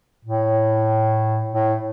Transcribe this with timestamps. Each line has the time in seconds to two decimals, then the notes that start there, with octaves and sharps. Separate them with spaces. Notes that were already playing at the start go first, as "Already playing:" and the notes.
0.24 A2
1.54 A2